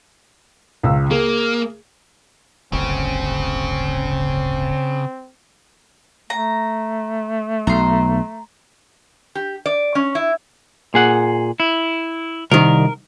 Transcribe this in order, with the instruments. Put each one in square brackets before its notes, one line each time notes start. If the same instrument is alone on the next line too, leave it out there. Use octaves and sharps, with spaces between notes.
[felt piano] C#2 C#3 E6
[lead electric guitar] A#3 [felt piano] G#4
[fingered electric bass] D1 G1 [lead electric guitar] C#3 [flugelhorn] C4
[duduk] A3 [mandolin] A#5
[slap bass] B1 [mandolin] A#5 C6
[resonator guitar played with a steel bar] G4
D5
C#4
E4
[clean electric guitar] A#2 G#4 F#5
E4
[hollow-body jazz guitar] C2 D#3 [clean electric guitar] A#4